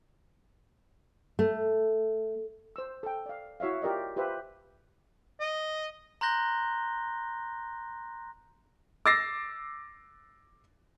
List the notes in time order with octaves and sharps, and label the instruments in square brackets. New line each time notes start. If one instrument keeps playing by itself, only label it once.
[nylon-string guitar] A3
[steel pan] C5 E6
A4 G5
D5 F5
E4 F#4 C#5 E5 F5
F4 G4 A#4 D5 D#5
F4 G4 B4 C5 E5
[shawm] D#5
[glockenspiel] A#5 C6 F#6 G6 A#6 G7
[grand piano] D6 E6 A6 A#6 C7